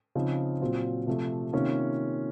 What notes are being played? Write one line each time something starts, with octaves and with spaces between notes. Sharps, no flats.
C#3 F3 C4 D#4
A#2 F#3 C4 F4
C3 F3 A3
C3 D#3 A#3 C#4 F4